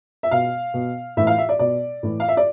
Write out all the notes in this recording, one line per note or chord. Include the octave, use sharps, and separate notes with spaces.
E5
B2 F5
B2
A2 E3 E5
F5
E5
D5
B2 D5
A2 E3
F5
E5
D5